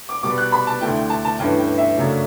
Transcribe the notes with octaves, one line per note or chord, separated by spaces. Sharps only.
D6
B2 G3 B3 D6
F#6
B5
A5
D2 D3 A3 E4 G5
G5
A5
A5
G2 E3 A3 C#4 E4 G5
G5
E5
F#2 C#3 F#3 A3 D4